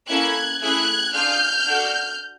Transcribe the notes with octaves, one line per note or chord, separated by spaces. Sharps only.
A#3 C#4 E4 A4 F#6 G#6
A3 C#4 E4 G#4 F#6 G#6
D4 F4 G#4 F6 G6
D4 F#4 A4